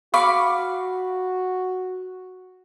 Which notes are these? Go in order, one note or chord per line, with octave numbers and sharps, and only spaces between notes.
F#4 F5 B5 C#6 D6